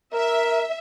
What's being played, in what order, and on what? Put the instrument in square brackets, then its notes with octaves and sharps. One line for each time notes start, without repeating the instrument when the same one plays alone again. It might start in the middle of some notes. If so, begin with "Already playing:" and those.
[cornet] A#4 [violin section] E5